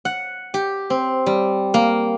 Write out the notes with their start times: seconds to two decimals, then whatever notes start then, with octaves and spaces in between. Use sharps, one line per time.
0.05 F#5
0.54 G4
0.90 C4
1.26 G3
1.74 A#3